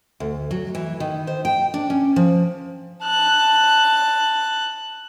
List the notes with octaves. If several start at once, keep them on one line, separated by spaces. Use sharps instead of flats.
D2
F#3
E3
D#3
C5
G5
D4
C#4
F3
A5 F#6